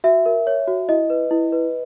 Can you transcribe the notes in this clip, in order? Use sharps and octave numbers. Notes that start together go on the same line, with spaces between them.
F#4 E5
A#4
C#5
F#4
E4 D#5
B4
E4
B4